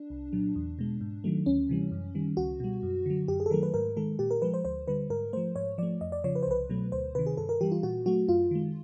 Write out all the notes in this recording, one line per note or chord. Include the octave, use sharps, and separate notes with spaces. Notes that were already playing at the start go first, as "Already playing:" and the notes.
Already playing: D4
C2
A#2 F#3
E2
B2 G#3
G#2
D#3 F#3 A3
D2 C#4
C3 E3 G3
F#2
D#3 G3
C#2 F#4
B2 G3
F#2
D3 F#3
F#2 G4
G#4
A4
D#3 F#3 A3 A#4
B4
G#2 A#4
D#3 G#3 A4
A#2 G4
A#4
F3 G#3 B4
C5
D2 C5
D3 G3 B4
G#2 A#4
F3 A3 C5
G#2 C#5
F3 A3 D5
F2 D#5
D5
C#3 F3 C#5
B4
C5
C2 B4
B2 F#3 A3
D2 C5
C3 D#3 B4
G#4
G2 A4
A#4
E3 G3 G4
F4
A#2 F#4
F#3 A3 F#4
F#2 F4
D#3 G#3